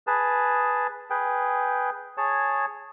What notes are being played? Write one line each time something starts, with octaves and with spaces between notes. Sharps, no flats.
G#4 B4 A5
G#4 B4 G5
G#4 C#5 A5